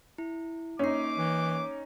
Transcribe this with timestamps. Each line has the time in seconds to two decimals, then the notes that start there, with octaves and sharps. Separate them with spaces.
0.18 E4
0.79 A#3 C#4 D#4 D6 C7
1.18 E3